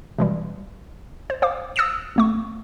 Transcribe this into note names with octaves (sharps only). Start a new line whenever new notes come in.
B2 E3 G3
C5
C5 F5 D6
D#6 E6 A6 A#6 C#7 E7
G#1 A3 C#6